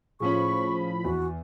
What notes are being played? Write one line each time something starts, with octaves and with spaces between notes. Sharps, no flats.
A2 F3 C#4 F4 G#4 B5 C#6
E2 F#4